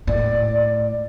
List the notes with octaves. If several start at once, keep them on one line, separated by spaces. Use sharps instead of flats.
A2 D5